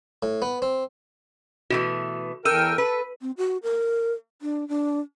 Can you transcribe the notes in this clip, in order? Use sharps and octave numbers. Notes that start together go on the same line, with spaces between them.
A2
B3
C4
B2 E3 A3 F#4
E2 A4 A#4 G5 E6 D#7
A4 B4
C4
F#4
A#4
D4
D4